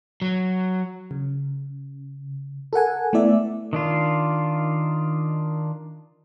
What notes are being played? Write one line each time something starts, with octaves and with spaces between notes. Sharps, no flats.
F#3
C#3
A4 A#4 F#5 G#5
A3 B3 E4 D5 E5
D#3 D4 F4